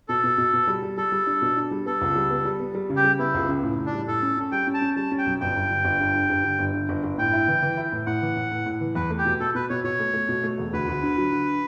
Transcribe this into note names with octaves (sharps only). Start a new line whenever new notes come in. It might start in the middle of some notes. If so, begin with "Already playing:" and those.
B2 A4
B2
B2
B2
G3
G3
G3 A4
G3
D4
B2
D4
G3
B3 A4
C#2
G3
B3
G3
B3
G3
C#3
G4
G3
B3 E4
C#2
C#3
A2
A2
D4
G3
A2 A4
C#4
C#4
G3 G5
C#4
A5
C#4
G3 A5
C#4
G5
B1
G1 G5
G2
D3
G1
G2
D3
G2
D3
G1
D3
G1
G1
A2 G5
E4
E3
E3
E4
A2
A2 F#5
E3
A2
A2
A2
E3
E2 B4
A3
G4
B2
B2 A4
B2 B4
B2 C#5
B2 C#5
A3
A3
B2
A3
E1
D2 B4
D2
D3
F#3
D3